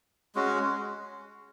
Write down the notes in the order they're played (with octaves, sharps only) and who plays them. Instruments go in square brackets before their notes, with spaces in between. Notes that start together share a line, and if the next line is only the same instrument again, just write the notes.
[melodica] G#3 C#4 F#4